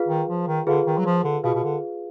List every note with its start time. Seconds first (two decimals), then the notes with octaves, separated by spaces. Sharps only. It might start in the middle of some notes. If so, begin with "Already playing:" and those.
Already playing: F4 G#4 B4 F5
0.09 D#3
0.29 F3
0.47 D#3
0.67 D3 F4 G#4 B4 F5
0.86 D#3
0.98 F#3
1.06 F3
1.24 D3
1.44 B2 F4 G#4 B4 F5
1.55 B2
1.63 D3